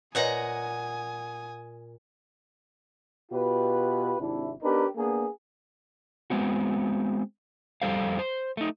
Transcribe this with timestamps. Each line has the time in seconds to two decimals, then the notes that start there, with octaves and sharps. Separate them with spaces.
0.15 A#2 B4 C#5 D#5 F#5 G#5 A#5 D#6
3.31 B2 F4 G4 B4
4.20 G#1 C3 D4 E4
4.62 B3 D4 D#4 G4 A#4 B4
4.96 A#3 B3 D4 G#4
6.30 G#3 B3 C4 F#4
7.82 F2 G3 A4 C5 F5
8.19 C5
8.57 A3 D#4